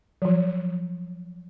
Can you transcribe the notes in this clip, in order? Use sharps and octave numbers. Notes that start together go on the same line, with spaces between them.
F3 F#3